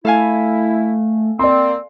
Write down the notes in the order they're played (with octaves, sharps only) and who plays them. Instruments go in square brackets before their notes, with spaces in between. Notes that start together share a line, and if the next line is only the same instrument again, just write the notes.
[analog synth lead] A3 [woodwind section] E4 [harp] A4 F5 G#5
[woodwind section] A#3 C4 [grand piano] D5 C6